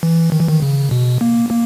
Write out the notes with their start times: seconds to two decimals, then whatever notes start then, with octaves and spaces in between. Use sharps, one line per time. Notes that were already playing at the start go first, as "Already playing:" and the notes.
0.03 E3
0.32 D#3
0.40 E3
0.48 D#3
0.62 C#3
0.91 B2
1.21 A#3
1.51 A#3